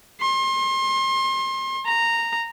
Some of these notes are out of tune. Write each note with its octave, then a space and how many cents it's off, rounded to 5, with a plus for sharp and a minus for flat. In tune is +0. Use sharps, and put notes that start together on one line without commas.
C6 +35
A#5 -10